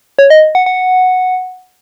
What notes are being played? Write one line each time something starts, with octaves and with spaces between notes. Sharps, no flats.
C#5
D#5
F#5
F#5